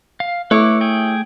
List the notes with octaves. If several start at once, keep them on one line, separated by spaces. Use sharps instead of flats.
F5
A3 E4 B4 C#5 D6
G#4 G5